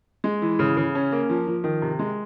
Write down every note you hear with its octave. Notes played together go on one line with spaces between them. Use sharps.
G#3
E3
C#3
C#3
C#4
A#3
F3
F3
D#3
C3
G#3